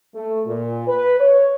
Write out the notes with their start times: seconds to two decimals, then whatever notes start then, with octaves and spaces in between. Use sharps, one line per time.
0.15 A3
0.45 A#2
0.87 B4
1.20 C#5